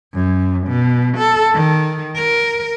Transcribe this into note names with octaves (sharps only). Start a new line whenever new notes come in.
F#2
B2
A4
D#3
A#4